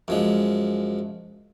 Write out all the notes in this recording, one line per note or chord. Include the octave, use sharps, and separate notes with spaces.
F#2 F3 G#3